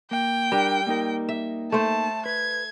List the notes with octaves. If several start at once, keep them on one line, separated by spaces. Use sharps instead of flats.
A#3 G5
G3 D4 A#4
A#3 D#4 A#4
E5
A3 C5 A5
B4 G#6